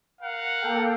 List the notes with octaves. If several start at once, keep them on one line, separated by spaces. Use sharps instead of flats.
A#4 F5 F#5
A#3 A4 G5